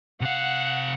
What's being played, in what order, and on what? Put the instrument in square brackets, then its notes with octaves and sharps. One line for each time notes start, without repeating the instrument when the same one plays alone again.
[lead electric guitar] C3 F5 [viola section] F#5